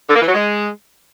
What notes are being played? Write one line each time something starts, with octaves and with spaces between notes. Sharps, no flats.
D3
A#3
E3
F#3
G#3